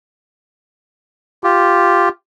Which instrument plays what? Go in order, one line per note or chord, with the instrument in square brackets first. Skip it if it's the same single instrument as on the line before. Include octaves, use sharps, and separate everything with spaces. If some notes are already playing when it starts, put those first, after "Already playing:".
[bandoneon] F4 G4